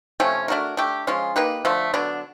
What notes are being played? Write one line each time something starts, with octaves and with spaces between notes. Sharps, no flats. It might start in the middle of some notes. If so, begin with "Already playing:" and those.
C3 F3 A3 C#4
A3 D4 F#4 A#4
A3 D4 G4
F3 G#3 C#4 F4
A#3 D#4 G4 B4
D3 F3 A3
D3 F#3 B3 D4